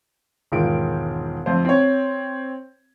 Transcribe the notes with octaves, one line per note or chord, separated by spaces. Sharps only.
E1 G#2 D#3 F4 D7
F2 C5
C4 C#5